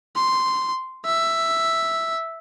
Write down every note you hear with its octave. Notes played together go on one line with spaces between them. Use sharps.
C6
E5